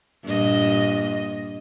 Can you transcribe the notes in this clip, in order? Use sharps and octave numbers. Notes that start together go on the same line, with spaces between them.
G2 A#2 D#5